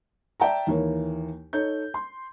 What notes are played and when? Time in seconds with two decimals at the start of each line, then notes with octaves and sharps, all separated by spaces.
0.40 D5 E5 G5 A5 A#5
0.67 D#2 E3 A#3 C#5
1.53 D#4 A4 C#5 G6
1.94 C6